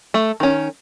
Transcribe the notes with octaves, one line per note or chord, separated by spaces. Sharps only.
A3
D#3 C#4